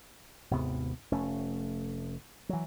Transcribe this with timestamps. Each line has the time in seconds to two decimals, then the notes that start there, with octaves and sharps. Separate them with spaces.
0.51 G#1 D#2 C3 B3
1.12 F1 A3 C#4
2.49 E3 F#3